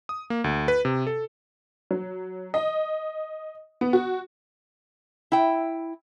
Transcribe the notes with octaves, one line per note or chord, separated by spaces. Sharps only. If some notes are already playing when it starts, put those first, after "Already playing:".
D#6
A#3
D2
B4
C3
A4
F#3
D#5
B3
F#4
E4 G5